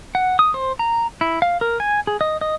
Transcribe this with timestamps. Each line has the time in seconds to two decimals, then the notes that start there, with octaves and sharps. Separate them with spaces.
0.15 F#5
0.39 D#6
0.54 C5
0.79 A#5
1.21 E4
1.42 F5
1.61 A#4
1.80 G#5
2.07 G#4
2.21 D#5
2.41 D#5